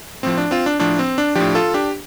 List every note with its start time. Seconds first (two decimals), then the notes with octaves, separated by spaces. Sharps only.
0.23 A2 F3 C4
0.38 D4
0.51 C4 F4
0.66 D4
0.79 A2 F3 D4
0.99 C4
1.18 D4
1.35 A2 F3 D4 G4
1.55 F4 A4
1.74 D4 G4